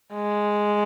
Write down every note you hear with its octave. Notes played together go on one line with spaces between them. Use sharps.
G#3